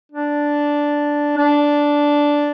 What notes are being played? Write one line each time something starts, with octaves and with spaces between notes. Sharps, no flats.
D4
D4